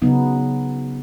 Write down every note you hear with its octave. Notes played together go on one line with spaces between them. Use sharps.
C#3 F#3 B3 D#4